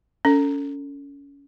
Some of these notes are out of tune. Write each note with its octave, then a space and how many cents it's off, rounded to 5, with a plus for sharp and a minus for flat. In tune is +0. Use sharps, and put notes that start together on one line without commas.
C#4 +25 A4 +25